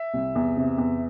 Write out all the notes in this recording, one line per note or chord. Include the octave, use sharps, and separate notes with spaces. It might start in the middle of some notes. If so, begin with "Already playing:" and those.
Already playing: E5
C2
E2
C3
E2